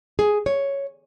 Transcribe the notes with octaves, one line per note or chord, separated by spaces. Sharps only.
G#4
C#5